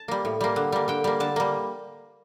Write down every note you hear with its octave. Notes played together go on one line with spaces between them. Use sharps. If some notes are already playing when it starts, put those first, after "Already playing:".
Already playing: A5
G3 A#3
A2
G3 A#3
D3
G3 A#3
D3 G5
G3 A#3
D3 A5
G3 A#3